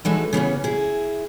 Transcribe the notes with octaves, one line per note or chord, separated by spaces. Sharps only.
E3 G#3 A3 D#4 E4 F#4
C#3 E3 B3 C#4
E4 G#4